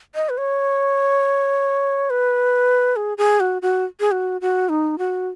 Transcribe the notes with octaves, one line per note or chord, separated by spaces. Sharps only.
D#5
B4
C#5
B4
G#4
G#4
F#4
F#4
G#4
F#4
F#4
D#4
F#4